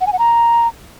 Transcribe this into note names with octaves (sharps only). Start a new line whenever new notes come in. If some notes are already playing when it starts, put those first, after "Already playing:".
F#5
G#5
F#5
A#5